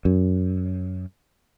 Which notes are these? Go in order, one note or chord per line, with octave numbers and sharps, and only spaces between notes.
F#2